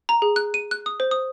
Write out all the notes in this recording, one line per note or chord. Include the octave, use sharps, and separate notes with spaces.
A#5
G#4
F#6
D#7
F#6
D#6
C5
D#6